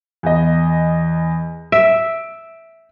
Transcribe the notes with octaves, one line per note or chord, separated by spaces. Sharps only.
E2 D#5
E5 D7